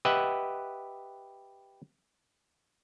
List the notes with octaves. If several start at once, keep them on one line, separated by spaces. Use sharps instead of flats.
G4 B4 D#5 E5 F#5